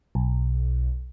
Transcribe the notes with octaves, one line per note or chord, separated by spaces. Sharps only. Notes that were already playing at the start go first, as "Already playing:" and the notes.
B1